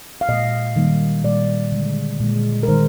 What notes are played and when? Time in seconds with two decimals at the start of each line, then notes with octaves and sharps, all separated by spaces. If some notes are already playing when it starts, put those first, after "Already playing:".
0.21 F5
0.29 A#2 G#3 D#5
0.76 D#3 G3 A#3
1.24 A#2 G3 A#3 D5
1.72 D3 G#3
2.20 A#2 G#3
2.63 A#4
2.68 D#3 G#3 C5